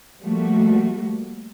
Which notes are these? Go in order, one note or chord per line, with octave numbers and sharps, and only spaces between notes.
F3 G3 A3 A#3 F#4